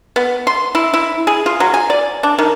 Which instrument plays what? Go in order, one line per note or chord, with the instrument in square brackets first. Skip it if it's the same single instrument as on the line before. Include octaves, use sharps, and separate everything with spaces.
[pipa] B3
C6
E4
E4
G#4
F4
F#3
G#5
D5
D4
D#3